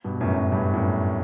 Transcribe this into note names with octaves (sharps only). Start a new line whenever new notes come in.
G2 B2
F#2 A2
F#2
G2
F#2 A2